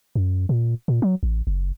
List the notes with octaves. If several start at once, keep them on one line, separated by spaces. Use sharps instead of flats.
F#2
A#2
A#2
F#3
A1
F#1